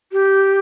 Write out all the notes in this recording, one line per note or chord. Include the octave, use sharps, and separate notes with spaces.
G4